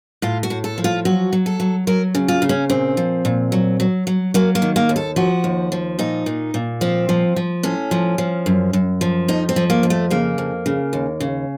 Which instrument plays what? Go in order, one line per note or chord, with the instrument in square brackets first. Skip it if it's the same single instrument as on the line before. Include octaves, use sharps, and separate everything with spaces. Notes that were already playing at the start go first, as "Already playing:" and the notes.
[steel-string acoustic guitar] A2 F4
F#4
A2
A4
F3
F4
F#3 F#4
F#3
A4
F#3
F#3 A#4
C#3
F4
C#3
C#4
A#2 C4
F3
A#2
F#3
F#3
F#3
F#3 A#3
A#3
D#3
A#3
D#2
A4
F3 F#4
D#2
F3
A#2 D#4
A#2
A#2
F3 C4
F3
F3
A2 C#4
F3
F3
F#2
F#2
F3
F2 D#4
C4
F3
A#3
F2
A3
C#3 A#3
F2
C#3
D#2
C#3